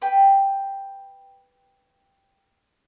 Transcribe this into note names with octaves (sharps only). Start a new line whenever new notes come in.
B4 G5 B5